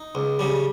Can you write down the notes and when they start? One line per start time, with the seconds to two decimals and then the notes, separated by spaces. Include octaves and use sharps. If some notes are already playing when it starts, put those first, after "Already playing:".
Already playing: D#4
0.15 C#2
0.39 C#3 G3